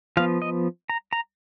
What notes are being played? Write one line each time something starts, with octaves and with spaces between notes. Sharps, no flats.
F3 B3 F5
D#5
A#5
A#5